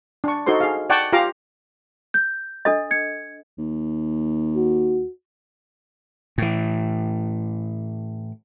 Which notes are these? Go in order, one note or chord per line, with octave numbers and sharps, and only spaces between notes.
D4 C#6
D#4 F#4 A4 C5 C6
G#4 F5
D5 F#5 G5 A5 C#6
F4 G4 F5 A#5 D6
G6
D4 A4 D#5
G#6 C#7
D#2
F#4
A2 E3